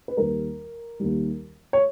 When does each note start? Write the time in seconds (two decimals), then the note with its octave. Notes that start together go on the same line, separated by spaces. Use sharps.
0.08 B4
0.17 D#2 D#3 G3 A#4
1.00 D#2 D#3 G3
1.73 C#5